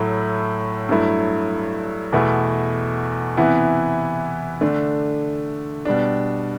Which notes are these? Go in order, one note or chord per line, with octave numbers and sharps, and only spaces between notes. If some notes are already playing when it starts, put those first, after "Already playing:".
Already playing: A2 F#3 A3 E4
G2 F#3 A3 E4
E2 B2 A3 E4
C3 E3 B3 E4
D3 A3 D4
B2 G3 D4